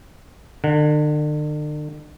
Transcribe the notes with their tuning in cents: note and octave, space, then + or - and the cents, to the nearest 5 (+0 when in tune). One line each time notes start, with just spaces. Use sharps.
D3 +40 F#5 -15